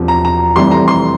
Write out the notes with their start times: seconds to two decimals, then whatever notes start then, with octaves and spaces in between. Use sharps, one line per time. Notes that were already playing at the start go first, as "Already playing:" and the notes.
Already playing: E1 E2 C3 F3
0.08 A#5
0.25 A#5
0.56 F1 F2 E3 G3 C6
0.71 A#5
0.88 C6